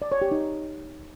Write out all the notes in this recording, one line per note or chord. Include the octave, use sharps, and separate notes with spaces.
D5
C#5
G4
D#4